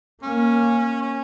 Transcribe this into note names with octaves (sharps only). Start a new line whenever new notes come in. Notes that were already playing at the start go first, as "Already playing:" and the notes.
A#3 C#4
C#4